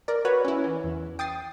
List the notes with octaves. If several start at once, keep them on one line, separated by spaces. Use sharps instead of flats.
A#4 D5
F#4 B4 C#5
C#4 E4
E3
E2
G5 D#6 A6 C7